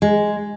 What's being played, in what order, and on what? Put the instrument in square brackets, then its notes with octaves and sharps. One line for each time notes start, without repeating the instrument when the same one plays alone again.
[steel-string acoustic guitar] G#3